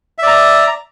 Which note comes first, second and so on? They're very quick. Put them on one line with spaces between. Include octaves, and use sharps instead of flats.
E5 D5 A#5